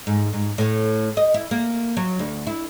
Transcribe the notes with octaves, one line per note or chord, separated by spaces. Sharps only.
G#2
G#2
A2
D#5
E4
A#3
F#3
D2
E4